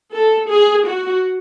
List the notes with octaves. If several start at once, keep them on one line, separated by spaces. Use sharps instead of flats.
A4
G#4
F#4